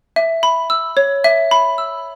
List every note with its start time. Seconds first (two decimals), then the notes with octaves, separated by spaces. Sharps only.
0.16 E5
0.43 B5
0.70 E6
0.97 C#5
1.24 E5
1.51 B5
1.78 E6